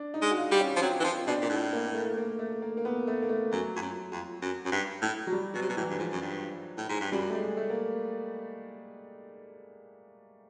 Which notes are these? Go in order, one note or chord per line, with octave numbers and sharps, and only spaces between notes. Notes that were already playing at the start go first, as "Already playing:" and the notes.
Already playing: D4
D#4
G#3
F#4
F4
G3
C#4
F3
F#3 C4
E3
F3 C4
B2 D4
A#2
A2
A#3
A#3
A3
A#3
A3
A#3
A#3
B3
A3
A#3
A3
F#2 F#3
F2
F#2
F2
F#2
F#2
G2
A2
F#3
G3
B2 F#3
C3
B2
A2 E3
G2
G#2 F3
F#2
G2
A2
G#2
G2
F#2 G3
A3
G#3
A3
A#3